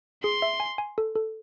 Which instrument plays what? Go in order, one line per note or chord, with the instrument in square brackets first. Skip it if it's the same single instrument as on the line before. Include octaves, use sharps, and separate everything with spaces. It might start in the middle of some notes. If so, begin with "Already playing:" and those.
[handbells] G#4 [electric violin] C6
[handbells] E5
G#5
G#5
A4
A4